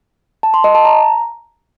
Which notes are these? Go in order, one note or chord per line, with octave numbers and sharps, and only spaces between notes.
A5
C6
D#5
A5
A#5